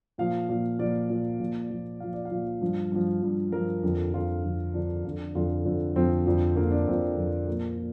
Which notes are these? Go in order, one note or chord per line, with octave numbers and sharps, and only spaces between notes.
A#2 F3 F5
A#2 F3
A#2 F3 D5
A#2 F3
A#2 F3
A#2 F3
A#2 F3 F5
D5
F5
A#2 F3
G2 F3
G2 F3
G2 F3
G2 F3 A#4
F2 D3 F3
F2 D3 F3 F4
F2 D3 F3
F2 D3 F3 D4
F2 D3 F3
F2 D3 F3 F4
F2 D3 F3
F2 D3 F3 C4
F2 D3 F3
F2 D3 F3 A#3
D4
F2 D3 F3 C4
F2 D3 F3
A#2 F3 A#3
A#2